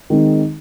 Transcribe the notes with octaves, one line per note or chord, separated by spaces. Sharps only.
D#3 G#3 C4 D#4